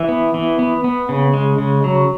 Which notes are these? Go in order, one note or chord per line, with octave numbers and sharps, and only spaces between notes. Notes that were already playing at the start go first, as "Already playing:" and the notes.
Already playing: E3 E5
B3
E3
B3
B3
C#3
G#3
C#3
F#3